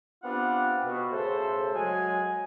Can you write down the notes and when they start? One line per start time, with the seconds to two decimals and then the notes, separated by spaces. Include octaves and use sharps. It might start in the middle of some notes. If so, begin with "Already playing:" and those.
0.23 B3 C4 D4 F4 G4 F#5
0.84 B2
1.11 C#3 A3 A4 C5
1.74 F#3 G#3 G#5